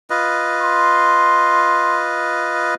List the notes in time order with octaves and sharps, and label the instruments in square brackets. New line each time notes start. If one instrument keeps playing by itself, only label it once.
[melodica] F4 B4 D#5
[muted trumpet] C6